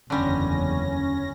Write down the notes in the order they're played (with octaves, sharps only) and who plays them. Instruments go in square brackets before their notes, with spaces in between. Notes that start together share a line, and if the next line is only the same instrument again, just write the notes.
[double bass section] F#1 E2 [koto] D3 G3 [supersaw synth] C#4 A#6